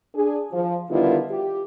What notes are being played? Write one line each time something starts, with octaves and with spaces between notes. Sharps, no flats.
D4 G#4
F3
D3 D#3 G3 B3 E4 F4
G4